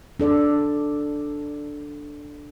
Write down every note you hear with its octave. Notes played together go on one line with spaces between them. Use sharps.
D4 A4 D5